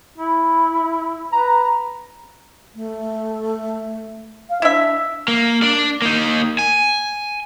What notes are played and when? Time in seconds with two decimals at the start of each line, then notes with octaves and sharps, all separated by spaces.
0.18 E4
1.32 B4 A#5
2.75 A3
4.50 F5
4.62 D4 E4 E5
5.28 A#3
5.62 D4 D5
6.02 A#3 D#4
6.59 G#5